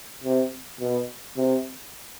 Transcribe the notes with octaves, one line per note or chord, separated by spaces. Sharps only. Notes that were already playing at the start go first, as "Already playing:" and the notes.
C3
B2
C3